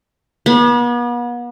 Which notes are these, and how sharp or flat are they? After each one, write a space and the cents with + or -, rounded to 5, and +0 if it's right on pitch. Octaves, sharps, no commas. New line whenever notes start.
B3 -40